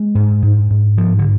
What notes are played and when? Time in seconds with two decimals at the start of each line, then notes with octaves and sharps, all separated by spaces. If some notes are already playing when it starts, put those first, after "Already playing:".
Already playing: G#3
0.15 G#2
0.42 G#2
0.70 G#2
0.97 G2 F3
1.19 D3